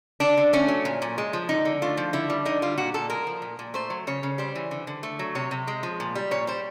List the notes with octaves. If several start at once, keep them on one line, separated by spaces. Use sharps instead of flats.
D3 D4
D3
A3 C#4
F#3
A#2
A#2
G#3
F3
D3 D#4
D3
A3 F4
F3
D3 E4
G3
D3 D#4
G3 F4
A#2 F#4
A#2 A4
G#3 A#4
F3
A#2
A#2
A3 C5
F#3
C#3 C#5
C#3
G3 C5
E3
D3
D3
A3
F#3
C3 C#5
C3
G#3
F3
A#2
G3
A#2 C#5
G3 C5